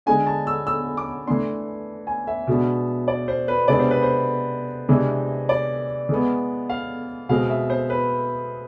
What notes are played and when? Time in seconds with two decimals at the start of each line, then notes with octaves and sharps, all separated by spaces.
0.06 D3 G#3 D4 G#5
0.26 A5
0.47 E6
0.67 E6
0.97 D6
1.27 E3 A3 D4 C6
2.07 G#5
2.27 E5
2.47 B2 G#3 B3 D4
3.08 D5
3.28 C5
3.48 B4
3.68 C3 G#3 B3 D4 D5
3.80 C5
3.91 B4
4.02 C5
4.89 C3 E3 G#3 D4
5.49 D5
6.09 E3 G#3 B3
6.70 F5
7.29 B2 G#3 C4 F5
7.50 E5
7.70 C5
7.90 B4